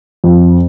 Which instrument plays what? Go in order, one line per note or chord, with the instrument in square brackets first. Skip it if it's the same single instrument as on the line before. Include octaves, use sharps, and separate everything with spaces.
[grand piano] F2